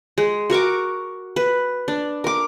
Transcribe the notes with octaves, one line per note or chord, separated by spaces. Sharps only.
G#3
F#4 A#4 C#6 D6
B4
D4
A#4 D6